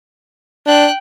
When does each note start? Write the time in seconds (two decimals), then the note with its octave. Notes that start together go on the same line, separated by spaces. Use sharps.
0.67 D4 G5 F#6